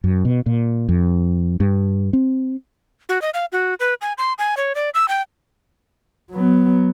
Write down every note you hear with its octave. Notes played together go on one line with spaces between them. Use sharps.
F#2
B2
A#2
F2
G2
C4
F#4
D#5
F5
F#4
B4
G#5
C6
G#5
C#5
D5
E6
G5
F#3 B3